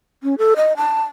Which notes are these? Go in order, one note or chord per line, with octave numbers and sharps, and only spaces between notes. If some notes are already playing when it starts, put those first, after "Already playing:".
C#4
A4
D#5
A5